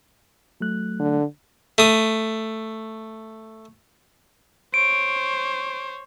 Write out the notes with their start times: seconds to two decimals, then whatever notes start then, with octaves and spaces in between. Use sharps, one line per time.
0.60 F#3 A3 F#6
0.99 D3
1.78 A3 D#6
4.74 C5 C#5 D7